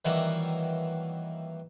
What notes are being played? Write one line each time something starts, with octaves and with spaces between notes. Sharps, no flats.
D#3 E3 F#3 G3 A#3 E4